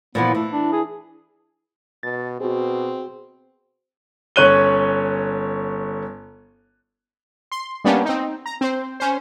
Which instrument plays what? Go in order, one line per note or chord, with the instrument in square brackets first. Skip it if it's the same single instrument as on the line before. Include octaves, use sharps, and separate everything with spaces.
[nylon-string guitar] A#2 E3 F3 [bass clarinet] B3
[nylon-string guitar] E3 [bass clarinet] A3
[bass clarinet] D4
G#4
[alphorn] B2 [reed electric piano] A6
[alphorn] B2 [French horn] C4 [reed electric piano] F#4 G#4
[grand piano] G1 C#4 C#5 F#6 D#7 G7
[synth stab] C6
G3 A#3 B3 C#4 D4 G4
C4 D#4
A#5
C4 C5
C#4 C5